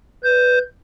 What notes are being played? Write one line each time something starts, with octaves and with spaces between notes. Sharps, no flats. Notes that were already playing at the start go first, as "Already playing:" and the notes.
B4 G6